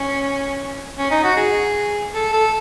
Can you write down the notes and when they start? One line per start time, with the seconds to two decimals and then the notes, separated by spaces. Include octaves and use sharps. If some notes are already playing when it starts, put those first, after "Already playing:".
Already playing: C#4
0.98 C#4
1.11 D#4
1.24 F#4
1.37 G#4
2.14 A4
2.33 A4